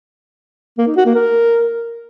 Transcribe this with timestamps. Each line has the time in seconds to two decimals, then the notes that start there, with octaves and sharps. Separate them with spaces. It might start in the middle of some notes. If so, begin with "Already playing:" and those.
0.78 A#3
0.87 D#4
0.96 F#4
1.06 A#3
1.15 A#4